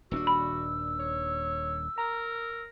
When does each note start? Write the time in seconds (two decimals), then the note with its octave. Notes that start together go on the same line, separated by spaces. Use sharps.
0.11 D#1 C#4 D4 F#4 E6
0.27 B5
0.99 C#5
1.98 A#4 A#5